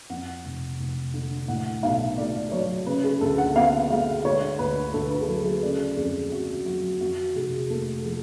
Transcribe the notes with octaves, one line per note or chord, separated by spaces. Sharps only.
F2 F#5
F1
F1
D3
A2 F#5
B1 F5
A3 D5
F#3 C#5
C#3 B4
G#4
D2 A4
F#5
B3 F5
G#3 F5
D3 C#5
D2 B4
D2 A4
B4
G#4
F#3 A4
G#4
C#3 D5
F2 G#4
F2 F#4
F#3 F#4
F2 F#4
F1 G#4
A3 A4
F3 G#4